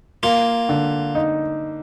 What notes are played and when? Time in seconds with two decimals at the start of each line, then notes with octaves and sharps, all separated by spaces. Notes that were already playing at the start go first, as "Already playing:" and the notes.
0.23 A#3 F4
0.69 D3
1.15 D#4